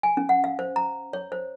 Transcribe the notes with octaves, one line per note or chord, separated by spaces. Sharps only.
G#5
C#4
F#5
F5
C5
A#5
C#5
C5